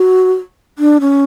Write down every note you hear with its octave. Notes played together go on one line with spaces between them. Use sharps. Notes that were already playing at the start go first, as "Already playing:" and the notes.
Already playing: F#4
D4
C#4